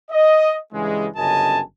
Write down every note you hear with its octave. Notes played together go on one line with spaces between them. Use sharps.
D#5
G2 C#3 E3 G3 G#3
G1 F#2 C#3 D#5 G#5 A5